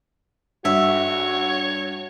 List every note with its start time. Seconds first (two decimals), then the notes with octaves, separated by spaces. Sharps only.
0.65 G2 F#4 C#5 E5